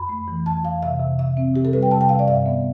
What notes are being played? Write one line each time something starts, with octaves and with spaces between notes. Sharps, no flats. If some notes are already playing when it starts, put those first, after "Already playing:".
Already playing: F2 B5
A3
E3
F2 A5
F2 F5
C3 E5
C3
C3 E5
C4
C3 G4
A4
G3 B4
G5
C3 A5
G5
C3 F5
D5
G2 E5
B3